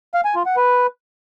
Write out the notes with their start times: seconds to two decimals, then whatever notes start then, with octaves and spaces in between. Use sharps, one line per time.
0.14 F5
0.25 G#5
0.35 F4
0.46 F#5
0.57 B4